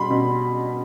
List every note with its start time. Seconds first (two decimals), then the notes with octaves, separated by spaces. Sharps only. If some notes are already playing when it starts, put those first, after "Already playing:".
Already playing: B2 G3 B5 C6
0.11 B2